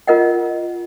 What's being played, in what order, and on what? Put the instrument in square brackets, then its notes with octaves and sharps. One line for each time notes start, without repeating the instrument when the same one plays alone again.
[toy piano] F4 A#4 D#5 F#5